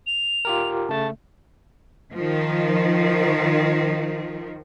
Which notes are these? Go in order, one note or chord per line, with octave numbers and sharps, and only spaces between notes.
F7
F4 G4 A#4
C#3 A3 A5
D#3 F3